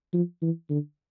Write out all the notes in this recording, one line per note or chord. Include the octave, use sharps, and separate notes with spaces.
F3
E3
D3